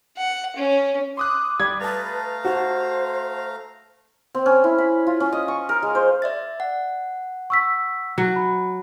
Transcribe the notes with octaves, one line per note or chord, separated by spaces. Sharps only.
F#5
C#4
C6 D6 D#6 F#6
G3 D5 B5 G#6
A3 B4 F5 A5 A#5 A6
F#4 C5
C4
C#4
E4
B5
F4
C#4
D#5
C#6
A#4
G#3
C5
D5 E5 A6
F#5
C#6 E6 B6
F#3
B5